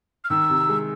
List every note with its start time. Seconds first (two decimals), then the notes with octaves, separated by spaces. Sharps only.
0.24 F6
0.30 D#3 E6
0.49 C3
0.69 G#3